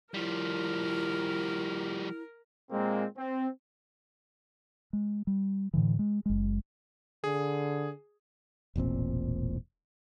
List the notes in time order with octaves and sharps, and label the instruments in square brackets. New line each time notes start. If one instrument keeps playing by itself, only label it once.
[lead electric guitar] F3 G3 [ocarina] E4 [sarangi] A#4
[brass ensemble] A#2 G#3 A#3 C4
C4
[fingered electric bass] G#3
G3
A2 D3 E3
G#3
F#1 G#3
[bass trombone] D3 [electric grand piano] G#4
[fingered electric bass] E1 A1 A#2 C4